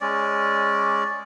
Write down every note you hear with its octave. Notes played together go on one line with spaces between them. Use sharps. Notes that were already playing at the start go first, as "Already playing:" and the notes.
G#3 C#4 D5